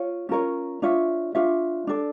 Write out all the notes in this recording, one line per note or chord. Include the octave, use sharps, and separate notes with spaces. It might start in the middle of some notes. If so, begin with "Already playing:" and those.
Already playing: F4 C#5
C#4 F4 A#4 C#5
D4 F4 C#5 E5
D4 F4 C#5 E5
D4 A4 D5